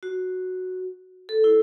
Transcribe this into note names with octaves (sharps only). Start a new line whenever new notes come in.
F#4
A4
E4